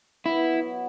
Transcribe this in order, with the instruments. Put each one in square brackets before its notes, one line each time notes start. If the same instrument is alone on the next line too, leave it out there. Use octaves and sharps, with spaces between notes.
[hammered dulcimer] B3 [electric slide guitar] E4
[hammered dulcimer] F#3